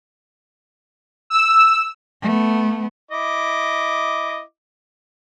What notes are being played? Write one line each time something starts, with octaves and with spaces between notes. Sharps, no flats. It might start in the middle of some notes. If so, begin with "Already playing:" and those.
E6
A3 B3
E4 D#5 D6